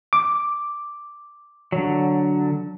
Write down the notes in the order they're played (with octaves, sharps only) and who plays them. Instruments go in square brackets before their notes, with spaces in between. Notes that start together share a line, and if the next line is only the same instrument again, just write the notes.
[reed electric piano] D6
[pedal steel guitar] D3 F#3